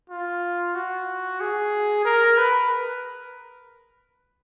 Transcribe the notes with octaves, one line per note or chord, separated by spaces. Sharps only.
F4
F#4
G#4
A#4
B4